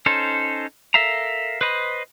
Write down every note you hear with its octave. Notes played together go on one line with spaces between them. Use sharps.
C#4 D#4 A4 C5
A4 A#4 E5 F5 A#5
B4 C5 D#5 B5